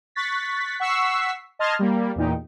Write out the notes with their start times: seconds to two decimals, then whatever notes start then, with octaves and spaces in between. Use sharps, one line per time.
0.15 C#6 F#6 A6 B6
0.80 F#5 C#6 E6 B6 C7
1.59 D#5 A5 C6 F6 G#6
1.79 G3 A#3
2.15 E2 A#2 D#4 G4